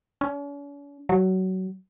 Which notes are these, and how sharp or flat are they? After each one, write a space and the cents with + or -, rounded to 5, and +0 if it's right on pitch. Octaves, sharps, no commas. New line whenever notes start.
C#4 +45
F#3 +20